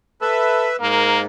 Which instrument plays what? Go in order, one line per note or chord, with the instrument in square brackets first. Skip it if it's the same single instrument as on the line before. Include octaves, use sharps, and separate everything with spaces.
[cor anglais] A4 [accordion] B4 E5
[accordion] G#2 [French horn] A#3 [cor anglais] A#4